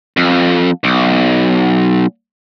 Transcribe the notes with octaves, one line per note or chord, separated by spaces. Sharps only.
F2
B1